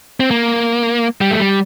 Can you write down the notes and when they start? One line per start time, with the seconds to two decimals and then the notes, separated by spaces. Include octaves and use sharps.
0.20 C4
0.31 A#3
1.21 G3
1.31 A3
1.39 G3